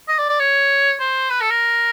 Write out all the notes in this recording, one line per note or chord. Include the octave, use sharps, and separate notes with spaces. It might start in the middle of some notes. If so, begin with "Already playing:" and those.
D#5
D5
D5
C#5
C5
B4
A4
A#4